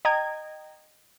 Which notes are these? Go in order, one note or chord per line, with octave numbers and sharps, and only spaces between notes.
D#5 G5 A#5 G#6